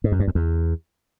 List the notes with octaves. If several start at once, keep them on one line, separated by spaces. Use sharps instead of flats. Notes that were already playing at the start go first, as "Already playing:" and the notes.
G#2
F#2
G2
F2
E2